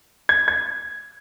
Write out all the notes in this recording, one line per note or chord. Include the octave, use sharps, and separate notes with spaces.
G#6
G#6